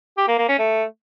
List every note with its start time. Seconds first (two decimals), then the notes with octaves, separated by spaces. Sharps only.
0.17 G4
0.28 A#3
0.38 A#3
0.48 C#4
0.59 A3